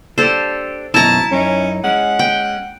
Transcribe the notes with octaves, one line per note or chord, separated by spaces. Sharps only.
D4 G4 A4 C5
F#2 B2 D#3 E4 A5 A#5
F#2 C#4 D#4
G#3 C#4 F#5
G5